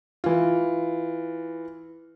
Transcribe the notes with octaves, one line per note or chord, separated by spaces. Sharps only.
E3 F4